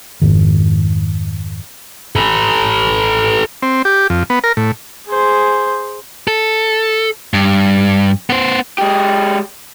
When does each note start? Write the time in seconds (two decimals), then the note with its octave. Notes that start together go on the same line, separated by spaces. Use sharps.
0.22 F2 G#2 D#3
2.16 A4 B4
3.62 C4
3.85 G4
4.10 F2
4.30 B3
4.44 A#4
4.57 A2
5.07 G#4 C5
6.28 A4
7.34 G2
8.30 B3 C5
8.78 G#3 G4